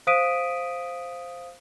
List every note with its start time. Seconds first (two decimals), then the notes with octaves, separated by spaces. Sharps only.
0.07 C5 F5 D#6 B6 D7 D#7